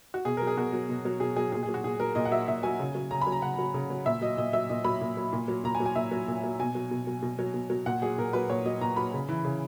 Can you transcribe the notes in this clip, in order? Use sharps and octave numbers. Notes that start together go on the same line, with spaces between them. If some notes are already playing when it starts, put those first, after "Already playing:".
F#4
B2 G#4
F#3 A#4
G#4
B2 F#4
F#3
B2
F#3
B2 G#4
F#3 G#4
A#2 G#4
G#4
F#3
F#4
A#2 G#4
F#3 A#4
A#2 D#5
F#5
F#3 E5
A#2 E5
F#3 G#5
C#3
F#3
C#3 A#5
B5
F#3
A#5
C#3 F#5
F#3
C#3
F#3
A#2 E5
F#3 D#5
A#2 D#5
F#3 E5
A#2 D#5
F#3 B5
A#2
F#3
A#2
F#3
A#2 A#5
G#5
F#3
G#5
A#2 E5
F#3
A#2
F#3
B2 G#5
F#3
B2
F#3
B2
F#3
B2
F#3
A#2 F#5
F#3 G#4
A#2 A#4
F#3 B4
A#2 C#5
F#3 D#5
A#2 A#5
F#3 B5
C#3
E3
C#3